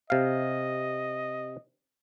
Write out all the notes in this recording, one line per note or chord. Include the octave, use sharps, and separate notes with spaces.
C3 D#5 F5